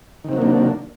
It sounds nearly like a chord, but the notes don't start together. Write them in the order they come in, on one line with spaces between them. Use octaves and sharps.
D#3 C3 F#3 A#3 D4